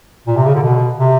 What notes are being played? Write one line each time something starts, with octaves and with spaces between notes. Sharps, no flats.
A#2
C3
C#3
D3
B2
C3